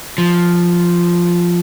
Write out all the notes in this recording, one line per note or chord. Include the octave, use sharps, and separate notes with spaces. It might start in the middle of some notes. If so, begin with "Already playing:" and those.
F3